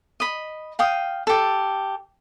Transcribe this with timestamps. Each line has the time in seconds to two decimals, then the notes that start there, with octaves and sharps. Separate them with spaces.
0.20 D#5 B5
0.79 F5 G5 D#6
1.27 G4 A4